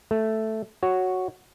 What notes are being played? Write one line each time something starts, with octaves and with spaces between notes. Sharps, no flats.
A3
F#4 C#5